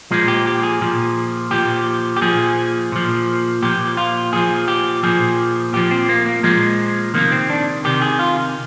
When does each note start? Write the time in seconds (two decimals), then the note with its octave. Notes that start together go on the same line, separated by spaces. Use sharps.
0.11 A#2 F3 G#3
0.28 G4
0.46 G4
0.63 G#4
0.81 A#2 F3
1.51 A#2 F3 G4
2.17 G4
2.21 A#2 F3 G#4
2.92 A#2 F3
3.63 A#2 F3 G4
3.97 F4
4.33 A#2 F3 G#4
4.68 G4
5.03 A#2 F3 G#4
5.73 A#2 F3 G4
5.91 C4
6.09 A#3
6.26 A#3
6.43 A#2 F3 G#3
7.14 C3 D#3 A#3
7.32 C4
7.50 D4
7.84 C3 D#3 G4
8.02 G#4
8.19 F4